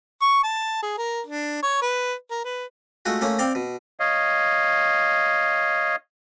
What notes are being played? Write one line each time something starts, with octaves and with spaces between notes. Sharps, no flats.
C#6
A5
G#4
A#4
D4
C#5
B4
A#4
B4
G#3 A3 F4 F#4
A3 A#3 C#4
C4 D5 F5 G5
B2
C#5 D#5 F5